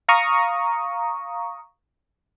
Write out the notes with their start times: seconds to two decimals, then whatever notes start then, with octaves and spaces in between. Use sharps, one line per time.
0.08 F5 A#5 C#6 D#6